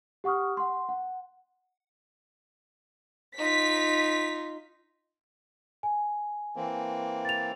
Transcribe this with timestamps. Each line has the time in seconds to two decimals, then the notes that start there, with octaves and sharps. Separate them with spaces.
0.24 G4 F#5 C#6 D#6 F6
0.57 F#5 C6
0.89 F#5
3.38 D#4 F4 B6
5.83 G#5
6.56 E3 A#3 C4
7.25 A6 F7